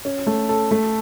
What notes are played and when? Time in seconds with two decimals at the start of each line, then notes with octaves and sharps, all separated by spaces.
0.05 C#4
0.27 A3
0.49 A4
0.71 A3